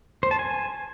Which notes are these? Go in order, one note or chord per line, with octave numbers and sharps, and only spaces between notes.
C5
A5
G#5